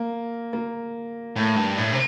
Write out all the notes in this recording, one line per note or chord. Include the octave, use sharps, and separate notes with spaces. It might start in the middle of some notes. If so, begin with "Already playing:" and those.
Already playing: A#3
A#3
A2
G2
A2
C3